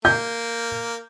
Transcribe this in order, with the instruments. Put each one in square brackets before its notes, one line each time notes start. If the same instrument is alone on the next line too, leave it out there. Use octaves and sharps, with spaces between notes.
[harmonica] A#3 [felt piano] G6